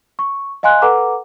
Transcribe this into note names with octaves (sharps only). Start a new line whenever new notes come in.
C#6
D#5 F5 G#5 C6 F#6
A4 B4 F#5 A#5 D6